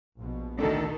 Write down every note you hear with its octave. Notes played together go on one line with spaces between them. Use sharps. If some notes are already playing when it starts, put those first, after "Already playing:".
A#1 B2
D2 D#3 D4 A4